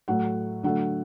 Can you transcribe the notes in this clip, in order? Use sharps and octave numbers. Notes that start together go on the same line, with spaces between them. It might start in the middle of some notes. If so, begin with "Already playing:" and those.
A2 F#3 A3 F#5
D3 F#3 A3 F#5